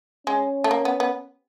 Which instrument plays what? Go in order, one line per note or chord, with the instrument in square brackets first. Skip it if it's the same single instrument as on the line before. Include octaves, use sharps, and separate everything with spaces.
[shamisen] G#3 [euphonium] C#4
[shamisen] A3
A#3
B3
B3